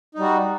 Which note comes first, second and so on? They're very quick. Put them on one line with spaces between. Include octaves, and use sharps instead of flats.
D#4 G3 F#4